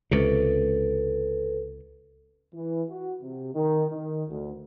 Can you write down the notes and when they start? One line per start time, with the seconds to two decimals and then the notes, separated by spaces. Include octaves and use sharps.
0.11 C#2 C3 A4 B4
2.54 E3
2.90 F#4
3.22 C3
3.53 D#3
3.90 D#3
4.29 D2